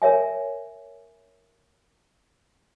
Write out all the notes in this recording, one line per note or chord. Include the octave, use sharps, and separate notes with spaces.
A#4 C#5 E5 G#5